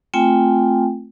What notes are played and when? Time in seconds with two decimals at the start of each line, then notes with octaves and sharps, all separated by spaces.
0.14 A3 C4 F4 G5 G#5